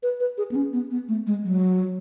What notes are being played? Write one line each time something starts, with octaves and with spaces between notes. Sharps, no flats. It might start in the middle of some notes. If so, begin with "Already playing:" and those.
B4
B4
G#4
B3
C#4
B3
B3
A3
G#3
F#3